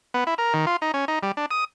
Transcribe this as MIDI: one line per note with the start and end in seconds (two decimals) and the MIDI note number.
0.14 0.24 59
0.27 0.34 64
0.38 0.53 70
0.54 0.66 51
0.66 0.76 65
0.82 0.92 63
0.94 1.05 61
1.08 1.19 63
1.23 1.32 55
1.37 1.46 62
1.51 1.64 87